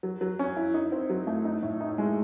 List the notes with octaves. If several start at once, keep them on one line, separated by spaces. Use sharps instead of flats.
F#3
F#3
C#4
E4
D#4
C4
F#3
A3
D#4
A2
D#4
G#3